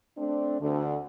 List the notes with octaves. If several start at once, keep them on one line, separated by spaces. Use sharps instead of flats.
A3 C4 D4
D2 D3